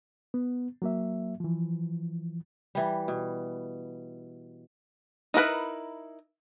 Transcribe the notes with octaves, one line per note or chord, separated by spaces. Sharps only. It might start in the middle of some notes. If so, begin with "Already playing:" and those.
B3
F#3 A#3 E5
E3 F3
E3 G3
B2
D#4 E4 A#4 B4